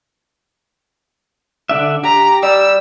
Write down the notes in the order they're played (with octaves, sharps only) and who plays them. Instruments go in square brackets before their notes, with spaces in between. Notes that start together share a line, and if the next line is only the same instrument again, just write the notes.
[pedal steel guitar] D3 D4 E5
[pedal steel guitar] G4 [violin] A#5
[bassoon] G3 [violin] E6